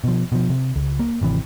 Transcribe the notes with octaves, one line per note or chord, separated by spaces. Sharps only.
B2 F3
B2 F3
C3
C#2
A#3
G#1 C3 E3